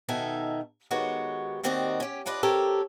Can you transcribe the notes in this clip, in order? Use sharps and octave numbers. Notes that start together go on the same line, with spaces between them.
B2 D#3 D#4 A4 E5 G#5
D#3 G#3 B3 F#4 G4 C#5
D#2 D#3 C4 F#4 D5 D#5
C#4 G4
D4 F4 B4 D5 D#5
C4 G4 A4 A#4 C#5